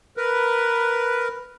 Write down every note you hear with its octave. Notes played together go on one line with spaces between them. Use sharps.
A#4 B4